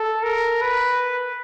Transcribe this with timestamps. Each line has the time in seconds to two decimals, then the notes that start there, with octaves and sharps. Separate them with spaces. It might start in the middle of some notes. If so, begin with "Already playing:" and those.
Already playing: A4
0.23 A#4
0.61 B4